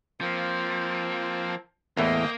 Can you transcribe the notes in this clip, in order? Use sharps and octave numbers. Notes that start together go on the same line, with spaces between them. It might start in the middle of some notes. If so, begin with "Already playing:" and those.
F3 A#3 C4
E2 A2 E3 A#3 C5 D#5 G5